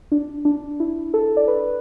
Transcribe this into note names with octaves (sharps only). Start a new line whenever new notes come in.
D4
D4
E4
A4
D5
B4